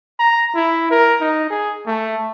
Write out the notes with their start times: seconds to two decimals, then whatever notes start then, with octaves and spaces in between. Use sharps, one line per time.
0.19 A#5
0.55 E4
0.91 A#4
1.20 D#4
1.50 G#4
1.86 A3